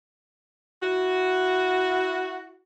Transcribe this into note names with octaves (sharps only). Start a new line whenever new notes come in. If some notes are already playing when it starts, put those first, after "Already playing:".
E4 F#4